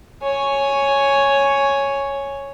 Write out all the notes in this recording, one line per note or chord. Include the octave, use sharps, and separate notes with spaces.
C#5 G#5